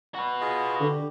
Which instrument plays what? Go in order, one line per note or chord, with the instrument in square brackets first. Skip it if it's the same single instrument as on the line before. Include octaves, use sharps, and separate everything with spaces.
[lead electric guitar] F#4 B4
[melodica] F4 G#4 D#5
[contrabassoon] D3 [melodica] G4